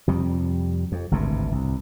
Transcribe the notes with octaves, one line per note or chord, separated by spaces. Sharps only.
F2 C3 G3
F2
G#1 D2 G2 C3
C2